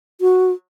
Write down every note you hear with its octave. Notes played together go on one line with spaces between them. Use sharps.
F#4